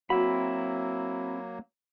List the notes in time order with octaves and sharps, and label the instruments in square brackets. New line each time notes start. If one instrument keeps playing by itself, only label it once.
[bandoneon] F#3 A#3 [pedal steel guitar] C4 E4 B5 [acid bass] F#4